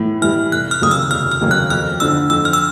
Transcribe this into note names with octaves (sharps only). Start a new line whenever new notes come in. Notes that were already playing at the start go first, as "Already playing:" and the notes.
Already playing: A2 E3
E3 G3 F6
F1 F#6
F6
D#2 C#3 F#3 A#3 D#6
E6
F1 F6
F6
D#2 C#3 F#3 A#3
F#6
F2 F6
D3 F3 E6
F2 E6
F6
E6